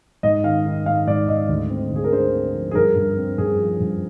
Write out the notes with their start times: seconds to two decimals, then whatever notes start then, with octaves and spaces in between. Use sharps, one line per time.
0.23 G#2 D#5
0.44 D#3 F5
0.66 D#3
0.86 G#2 F5
1.07 G#2 D5
1.28 G#2 D#5
1.49 D2
1.70 C4
1.91 D2 G#4
2.04 A#4
2.12 D3 C5
2.33 C4
2.54 F3
2.71 G#4
2.75 G2 A#4
2.96 G2
3.17 C4
3.38 G2 G#4
3.59 F3
3.80 G2